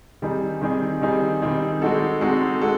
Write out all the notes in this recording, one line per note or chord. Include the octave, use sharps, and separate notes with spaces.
D#3 G3 C4 D#4 G#4
D#3 G3 C4 D#4 G#4
D#3 G3 C4 D#4 G#4
D#3 G3 C4 D#4 G#4
G#3 C4 D#4 F#4 A4
G#3 C4 D#4 F#4 A4
G#3 C4 F#4 A4